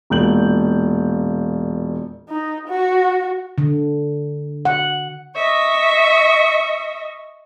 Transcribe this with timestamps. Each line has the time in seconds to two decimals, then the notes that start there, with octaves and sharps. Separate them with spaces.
0.10 E1 A#2 G6 F#7
2.29 D#4
2.68 F#4
3.58 D3
4.65 F#5
5.35 D#5 E5 C#6